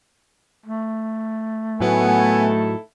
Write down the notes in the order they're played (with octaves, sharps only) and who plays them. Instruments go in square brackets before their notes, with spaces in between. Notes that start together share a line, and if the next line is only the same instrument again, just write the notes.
[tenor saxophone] A3
[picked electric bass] A2 F#3 [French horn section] D#3 E4 A4 [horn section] B3 G#5